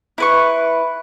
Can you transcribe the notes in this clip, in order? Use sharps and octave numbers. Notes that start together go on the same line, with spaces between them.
E4 B4 C#6